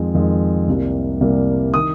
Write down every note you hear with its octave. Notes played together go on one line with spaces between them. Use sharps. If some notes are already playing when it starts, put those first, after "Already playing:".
Already playing: F2 D#3 G#3
F2 D#3 G#3
C2 C3 G3 A#3
C2 C3 G3 A#3
D#3 D#6